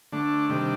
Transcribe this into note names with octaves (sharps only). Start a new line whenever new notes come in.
D3 A3 D4
C3 D#3 G3 D4